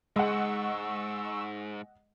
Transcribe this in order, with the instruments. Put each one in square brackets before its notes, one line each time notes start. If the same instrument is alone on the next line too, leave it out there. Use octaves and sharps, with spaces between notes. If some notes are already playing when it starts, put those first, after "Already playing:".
[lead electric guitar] G#2 [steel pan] G#3 [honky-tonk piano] D#5 F#5 [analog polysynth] C#6 E6